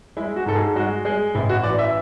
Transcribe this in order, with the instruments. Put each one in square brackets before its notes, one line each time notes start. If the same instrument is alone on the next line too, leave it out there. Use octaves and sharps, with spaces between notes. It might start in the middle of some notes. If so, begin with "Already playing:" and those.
[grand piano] G#3 E4
F#4
G#2 A4
G#4
G#3 F#4
G#3 G#4
A1 E4
F#4
E3 D5
E5